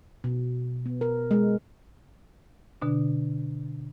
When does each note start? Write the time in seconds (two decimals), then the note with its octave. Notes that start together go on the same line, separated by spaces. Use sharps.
0.24 B2
0.86 B3
1.01 A#4
1.31 G#3
2.82 B2 D3 D4